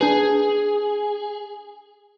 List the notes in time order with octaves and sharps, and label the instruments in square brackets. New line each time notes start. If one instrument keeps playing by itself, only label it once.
[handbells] D4 B4 [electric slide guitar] G#4